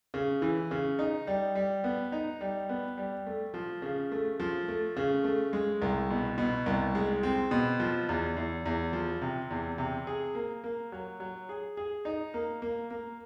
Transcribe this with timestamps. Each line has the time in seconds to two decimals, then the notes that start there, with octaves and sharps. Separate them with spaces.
0.14 C#3
0.42 E3
0.71 C#3
0.99 D#4
1.27 G3
1.55 G3
1.84 B3
2.12 D#4
2.41 G3
2.69 B3
2.97 G3
3.27 A3
3.54 F3
3.82 C#3
4.12 A3
4.40 F3
4.68 A3
4.97 C#3
5.24 A3
5.53 G#3
5.82 C2
6.10 B2
6.38 B2
6.66 C2
6.95 G#3
7.23 C4
7.51 B2
7.80 F3
8.09 E2
8.37 E2
8.66 E2
8.93 F3
9.22 C3
9.51 E2
9.78 C3
10.07 G#4
10.35 A#3
10.64 A#3
10.92 F#3
11.20 F#3
11.49 G#4
11.77 G#4
12.05 D#4
12.34 A#3
12.62 A#3
12.91 A#3